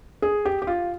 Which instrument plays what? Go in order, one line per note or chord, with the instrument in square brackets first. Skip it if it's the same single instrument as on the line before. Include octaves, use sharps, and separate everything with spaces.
[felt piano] G#4
G4
G4
F4